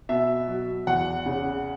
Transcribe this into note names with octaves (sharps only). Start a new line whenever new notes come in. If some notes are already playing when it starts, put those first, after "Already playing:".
B2 E5
F#3
E2 F#5
C#3